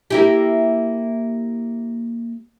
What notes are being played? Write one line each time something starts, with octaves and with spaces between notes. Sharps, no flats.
A#3 E4 G4